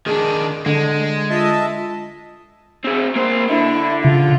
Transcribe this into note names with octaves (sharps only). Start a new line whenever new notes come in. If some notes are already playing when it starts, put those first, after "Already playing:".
D#3 D4 G#4
D3 G#3 A4
F4 D#5 E5 A5
C4 G#4
A#3 C5
D3 E4
C#3 F4